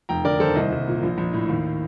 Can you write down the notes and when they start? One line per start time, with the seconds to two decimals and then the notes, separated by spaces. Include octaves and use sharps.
0.09 F1 G5 A#5
0.25 D3 A#4 D5
0.40 D#2 A4 C5
0.56 C2 C5 D#5
0.72 C2
0.88 A#2
1.03 A#1
1.18 A#1
1.33 A2
1.49 D#2